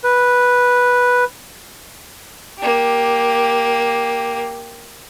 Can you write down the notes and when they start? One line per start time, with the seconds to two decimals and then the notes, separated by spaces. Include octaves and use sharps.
0.04 B4
2.59 A#3 G4